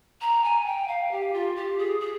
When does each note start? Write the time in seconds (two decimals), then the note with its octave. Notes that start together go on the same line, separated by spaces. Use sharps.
0.21 A#5
0.44 G#5
0.66 G5
0.87 F5
1.11 G4
1.33 F4
1.56 G4
1.78 G#4
2.00 G#4